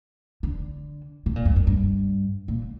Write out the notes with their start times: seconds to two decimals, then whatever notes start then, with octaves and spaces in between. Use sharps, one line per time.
0.43 D3
1.26 B2
1.36 A#2
1.45 F#2
1.56 F#2
1.67 G2
2.48 A#2